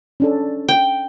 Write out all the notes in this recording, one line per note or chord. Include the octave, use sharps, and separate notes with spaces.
C#4 D4 A4
G5